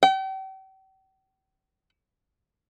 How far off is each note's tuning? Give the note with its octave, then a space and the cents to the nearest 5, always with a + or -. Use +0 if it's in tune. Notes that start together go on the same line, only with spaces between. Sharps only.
G5 -40